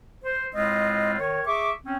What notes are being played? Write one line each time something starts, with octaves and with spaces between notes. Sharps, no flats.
C5
A2 G#3 C4 F4 D#5
D#3 C#5
G#4 E5 C#6 D6
C4 C#4